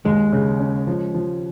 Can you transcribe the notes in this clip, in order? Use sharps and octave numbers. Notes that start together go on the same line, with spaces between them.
D#2 G#3
C#3
C#4
F3
F3